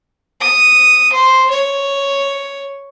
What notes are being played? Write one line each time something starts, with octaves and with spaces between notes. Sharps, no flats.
D#6
C5
C#5